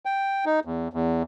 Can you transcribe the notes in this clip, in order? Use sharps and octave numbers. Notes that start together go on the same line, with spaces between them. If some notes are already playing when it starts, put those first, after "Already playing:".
G5
D#4
E2
E2